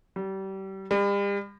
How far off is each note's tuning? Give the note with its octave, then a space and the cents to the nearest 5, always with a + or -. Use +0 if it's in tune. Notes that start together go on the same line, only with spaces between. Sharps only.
G3 -30
G3 +40